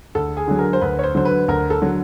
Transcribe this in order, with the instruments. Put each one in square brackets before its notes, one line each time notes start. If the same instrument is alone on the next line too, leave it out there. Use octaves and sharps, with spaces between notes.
[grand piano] D2 A4
G#4
D3 F#3
A#4
C5
D2 B4
C#5
C5
D3 F#3 C5
B4
D2 A#4
A4
D3 F#3